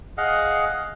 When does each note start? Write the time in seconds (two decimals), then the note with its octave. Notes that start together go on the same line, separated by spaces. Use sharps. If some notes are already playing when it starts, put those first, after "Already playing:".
0.17 G#4 D#5 F5 F#5